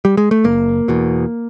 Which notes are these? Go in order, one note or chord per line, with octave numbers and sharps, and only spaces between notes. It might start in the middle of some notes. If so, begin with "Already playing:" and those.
G3
G#3
A3
F#1 A#3
E2 B2